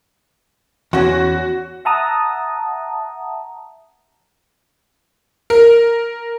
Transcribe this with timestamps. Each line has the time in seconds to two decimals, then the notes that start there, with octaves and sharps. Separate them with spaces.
0.93 E2 C#4 F#4
1.85 E5 F#5 A5 A#5 D#6
5.50 A#4